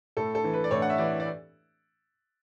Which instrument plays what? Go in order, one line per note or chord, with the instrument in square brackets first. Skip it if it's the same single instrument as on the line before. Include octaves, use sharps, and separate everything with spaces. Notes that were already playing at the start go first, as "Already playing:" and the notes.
[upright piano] A2 A4
A4
E3
B4
D5
A2 C#5
F#5
E5
E3 D5
D5